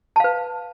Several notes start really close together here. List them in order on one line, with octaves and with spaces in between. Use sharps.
A5 F5 B4